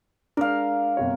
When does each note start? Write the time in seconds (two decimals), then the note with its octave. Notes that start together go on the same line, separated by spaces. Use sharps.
0.37 G#3 D4 A#4 F5
0.97 G1 C3 C#5